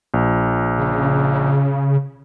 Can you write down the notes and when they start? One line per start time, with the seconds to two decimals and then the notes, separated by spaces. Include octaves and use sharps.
0.14 A#1
0.77 C#3